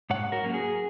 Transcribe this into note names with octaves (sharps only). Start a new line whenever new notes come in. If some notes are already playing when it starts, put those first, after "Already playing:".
G#2 C#5 F#5
F#4 A#4
F#3 A#3 C#4
G#4